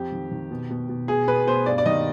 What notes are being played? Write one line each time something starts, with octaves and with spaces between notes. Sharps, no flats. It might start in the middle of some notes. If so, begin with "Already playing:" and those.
Already playing: F2 G4
D#3
D#3
B2
B2
B2
B2 G#4
B2 B4
B2 C5
G2 D5
D5
D#3 D#5